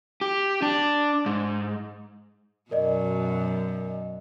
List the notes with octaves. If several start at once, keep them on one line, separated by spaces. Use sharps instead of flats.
G4
D4
G#2
F#2 B2 A#4 D5 D#5